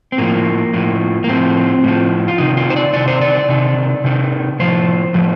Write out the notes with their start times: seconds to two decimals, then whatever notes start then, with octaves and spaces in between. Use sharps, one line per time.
0.12 C4
0.18 A2 F3 A#3
0.74 A2 F3
1.24 A#3
1.28 A2 F3 C4
1.84 A2 F3
2.28 F4
2.38 C3 D#3 D#4
2.57 F4
2.70 C5
2.76 D5
2.93 C3 D#3 D5
3.08 C5
3.21 D5
3.49 C3 D#3
4.04 C3 D#3
4.60 A2 F3 C5
5.14 A2 F3